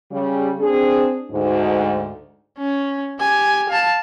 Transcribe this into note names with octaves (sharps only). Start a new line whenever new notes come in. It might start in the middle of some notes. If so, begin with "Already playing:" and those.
C#3 G3
C4 D4 G#4
D2 G#2
C#4
G4 G#5
F5 A5